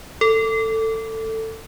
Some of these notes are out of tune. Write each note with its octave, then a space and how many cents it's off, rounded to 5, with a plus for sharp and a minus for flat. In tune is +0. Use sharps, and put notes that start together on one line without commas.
A4 +20